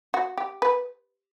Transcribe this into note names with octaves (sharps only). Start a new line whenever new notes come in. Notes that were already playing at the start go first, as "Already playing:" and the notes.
F#4
G4
B4